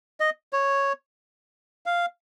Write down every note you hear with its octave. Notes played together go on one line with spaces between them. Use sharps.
D#5
C#5
F5